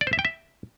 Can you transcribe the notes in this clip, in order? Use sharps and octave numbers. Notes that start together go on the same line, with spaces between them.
D5
C5
E5
G5
E5